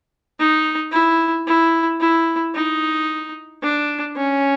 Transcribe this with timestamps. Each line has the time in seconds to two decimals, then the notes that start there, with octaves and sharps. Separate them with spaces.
0.39 D#4
0.92 E4
1.47 E4
2.00 E4
2.55 D#4
3.63 D4
4.17 C#4